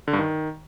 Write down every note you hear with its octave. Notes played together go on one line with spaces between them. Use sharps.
D3
G2
D#3